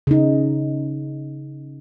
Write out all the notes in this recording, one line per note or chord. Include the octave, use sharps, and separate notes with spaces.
C#3 D#4